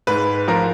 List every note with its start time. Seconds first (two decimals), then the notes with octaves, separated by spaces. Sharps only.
0.07 G#2 B4
0.48 F3 A#4